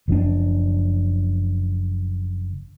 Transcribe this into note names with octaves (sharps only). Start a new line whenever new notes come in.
F#1 F3 C#4 D4